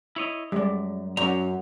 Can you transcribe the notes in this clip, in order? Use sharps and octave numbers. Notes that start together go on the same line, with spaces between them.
E4 C#5 D#5
F#2 G3 G#3 D5
F#2 C#4 D5 A#5